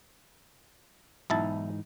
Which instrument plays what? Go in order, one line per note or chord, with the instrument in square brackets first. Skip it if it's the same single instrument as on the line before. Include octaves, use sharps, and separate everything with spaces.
[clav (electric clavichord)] B1 E4 A5 [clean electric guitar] G#2 E3 D#4